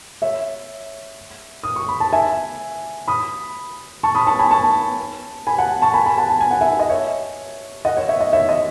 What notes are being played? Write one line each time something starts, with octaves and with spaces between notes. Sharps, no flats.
C#5 E5
D#6
C#6
B5
A5
E5 G#5
B5 D#6
A5 C#6
B5 D#6
A5 C#6
G#5 B5
A5 C#6
G#5 B5
F#5 A5
A5 C#6
G#5 B5
G#5 B5
F#5 A5
A5
G#5
F#5
E5 G#5
D#5
C#5 E5
D#5 F#5
C#5
C#5 E5
D#5
C#5 E5
D#5